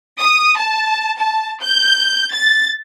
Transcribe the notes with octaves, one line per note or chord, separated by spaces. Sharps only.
D#6
A5
A5
G6
A6